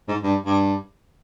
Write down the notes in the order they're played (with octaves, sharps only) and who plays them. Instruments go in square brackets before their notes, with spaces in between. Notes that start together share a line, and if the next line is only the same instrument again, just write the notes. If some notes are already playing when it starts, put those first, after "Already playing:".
[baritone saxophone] G#2
G2
G2